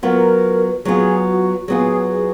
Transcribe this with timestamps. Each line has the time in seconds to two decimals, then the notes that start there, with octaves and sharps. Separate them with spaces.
0.03 F#3 B3 F4 A#4
0.85 F#3 B3 F4 G#4
1.27 F#4
1.68 F#3 B3 F4 G#4
2.09 G#4